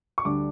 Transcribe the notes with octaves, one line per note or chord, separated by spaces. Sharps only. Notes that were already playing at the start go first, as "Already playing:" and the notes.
C#6
D2 D3 G3 D4 D6